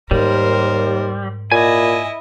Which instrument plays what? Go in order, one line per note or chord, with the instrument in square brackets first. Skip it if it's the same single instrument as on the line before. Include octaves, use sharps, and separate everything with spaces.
[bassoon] D#2 [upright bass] G#2 [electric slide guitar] G3 [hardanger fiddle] A#4 C5
[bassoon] A#2 [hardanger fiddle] E4 D#5 [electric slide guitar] G#5